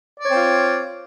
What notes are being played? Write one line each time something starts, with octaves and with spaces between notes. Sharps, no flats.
C4 F4 C#5 D5